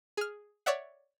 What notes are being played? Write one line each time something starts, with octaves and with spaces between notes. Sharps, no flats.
G#4 F6
C#5 D5 E5 F#5